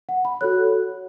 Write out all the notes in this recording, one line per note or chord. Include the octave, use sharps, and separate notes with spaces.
F#5
B5
F#4 A4 C#5 F#6